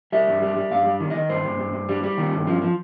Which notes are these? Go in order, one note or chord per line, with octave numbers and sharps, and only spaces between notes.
G3 E5
G2
G3
G3
G2 F5
G3
D#3
D#3 D#5
G2 C5
G2
G2
G2
G3
G3
D#3
G2
F3
F3